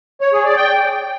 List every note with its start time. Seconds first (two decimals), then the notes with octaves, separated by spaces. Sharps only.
0.21 C#5
0.33 G#4
0.45 D5
0.56 G5